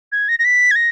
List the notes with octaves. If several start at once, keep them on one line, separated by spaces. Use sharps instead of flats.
G#6
A#6
A#6
B6
G#6
A#6